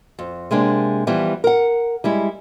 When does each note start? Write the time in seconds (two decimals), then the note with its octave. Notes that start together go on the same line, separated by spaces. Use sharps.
0.19 F2
0.51 C3 G#3 A#3 D4
1.07 E3 F3 G3 B3
1.44 A#4 F#5
2.04 G3 G#3 E4